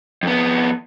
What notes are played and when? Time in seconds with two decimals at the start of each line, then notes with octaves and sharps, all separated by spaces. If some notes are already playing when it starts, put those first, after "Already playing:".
0.23 F2 B3